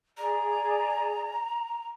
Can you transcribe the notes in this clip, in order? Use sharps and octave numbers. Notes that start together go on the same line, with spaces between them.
G#4 D5 A#5